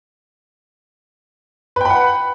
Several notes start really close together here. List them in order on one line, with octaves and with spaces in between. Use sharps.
B4 G5 B5 F#5